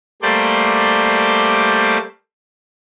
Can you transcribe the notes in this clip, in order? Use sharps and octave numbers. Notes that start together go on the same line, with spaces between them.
G3 A3 A#3 C5 D5 G5